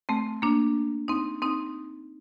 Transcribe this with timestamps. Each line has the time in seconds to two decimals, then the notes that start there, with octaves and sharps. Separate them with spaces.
0.09 A3 C4
0.42 A#3 D4
1.08 C4 D#4
1.42 C4 D#4